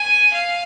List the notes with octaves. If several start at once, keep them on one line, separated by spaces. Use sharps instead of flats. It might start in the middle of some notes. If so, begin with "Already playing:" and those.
Already playing: G#5
F5